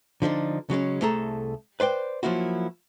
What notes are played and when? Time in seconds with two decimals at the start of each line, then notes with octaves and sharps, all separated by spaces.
0.22 D3 F3 D4 D#4
0.70 C#3 F#3 G#3 C#4
1.01 C2 A3 G#4 A4 A#5
1.80 B4 C5 D5 G5
2.23 F3 F#3 A#3 E4 F#4